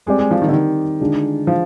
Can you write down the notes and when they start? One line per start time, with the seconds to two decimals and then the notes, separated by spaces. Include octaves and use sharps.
0.06 G3 G#3 C4 G4 D5
0.19 G#3
0.31 F3
0.42 D#3
0.48 D3
0.53 D#3
1.00 D3 G#3 D4 F4
1.47 F3